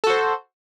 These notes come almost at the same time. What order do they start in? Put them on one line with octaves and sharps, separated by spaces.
A4 F#4 C5